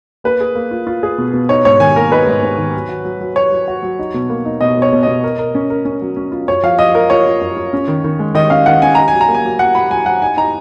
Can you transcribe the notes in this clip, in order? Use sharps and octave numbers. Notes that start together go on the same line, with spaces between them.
A#3 B4
G#4
A#3
F4
F4
G#4
B2
B2
D#4 C#5
G#2 C#5
D#3 G#5
A#3 A#4
D#4 B4
G#2
G#2
D#3
F#3
F#4
F#3
F#3
F#3 C#5
F#3
F#4
F#3
D#4
B2
A#3
D#4
B2 D#5
B2
C#5
B2
B2 D#5
A#4
A#4
C#4
A#4
C#4
F#3
C#4
F4
F#2 C#5
F3 F5
F3 D#5
F4 A#4
F4 C#5
F4
F#2
F4
C#4
D#3
D#3
G#3
D#3 D#5
C#4 F5
D#3 F#5
C#4 G#5
D#4 A#5
F#3 G#5
A#5
A#3
G#5
F#3
F#3 F#5
F#3 B5
F#3 G#5
F#3 F#5
D#4 G#5
D#4 A#5